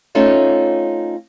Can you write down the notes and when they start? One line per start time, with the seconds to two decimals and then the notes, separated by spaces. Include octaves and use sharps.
0.15 A3 C4 C#4 D#4 F4 E5